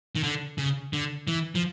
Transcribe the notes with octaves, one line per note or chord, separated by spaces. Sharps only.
D#3
D3
C#3
D3
E3
F3